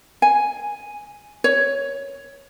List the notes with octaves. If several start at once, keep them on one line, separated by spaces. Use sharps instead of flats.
G#5
C#5